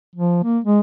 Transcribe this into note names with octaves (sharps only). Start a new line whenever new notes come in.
F3
A#3
G#3